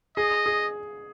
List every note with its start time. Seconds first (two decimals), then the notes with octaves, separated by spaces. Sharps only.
0.17 G#4 D#5
0.46 G#4